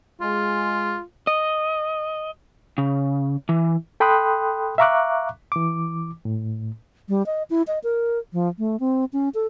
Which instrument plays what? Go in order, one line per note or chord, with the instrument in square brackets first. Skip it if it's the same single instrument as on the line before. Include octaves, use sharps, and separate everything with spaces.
[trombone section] G#3 [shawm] F4
[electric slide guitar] D#5
C#3
E3
[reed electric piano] A4 G5 B5 C6 D#6 F#6
E5 F5 A#5 C#6 D6 F#6
E3 D6
A2
[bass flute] G3
D#5
E4
D#5
A#4
F3
A3
C4
C#4
A4